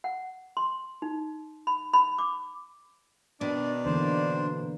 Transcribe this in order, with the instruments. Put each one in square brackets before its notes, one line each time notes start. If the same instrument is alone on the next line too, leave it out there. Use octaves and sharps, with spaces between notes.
[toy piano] F#5
C6
D#4
B5
B5
D6
[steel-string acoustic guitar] B2 [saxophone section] D#3 D5 [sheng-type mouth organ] D4
[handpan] D3 E3 A#3 [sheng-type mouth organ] D4 C5